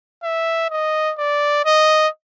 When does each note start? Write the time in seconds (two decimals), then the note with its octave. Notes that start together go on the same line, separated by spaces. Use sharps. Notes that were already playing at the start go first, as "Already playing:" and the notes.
0.23 E5
0.70 D#5
1.18 D5
1.65 D#5